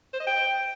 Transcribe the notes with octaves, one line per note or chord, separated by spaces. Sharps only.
C5
D#5
G5